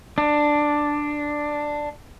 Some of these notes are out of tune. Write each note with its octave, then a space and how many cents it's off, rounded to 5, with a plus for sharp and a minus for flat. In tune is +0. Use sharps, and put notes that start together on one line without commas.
D4 +5